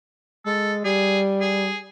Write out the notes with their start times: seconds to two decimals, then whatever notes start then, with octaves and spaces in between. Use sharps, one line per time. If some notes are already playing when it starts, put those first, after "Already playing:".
0.46 G#3 A4
0.85 G3 G#4
1.41 G#4